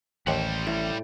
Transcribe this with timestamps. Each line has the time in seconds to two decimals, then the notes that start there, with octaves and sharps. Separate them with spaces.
0.27 A1 D#2 G3 C5 F#5
0.67 A2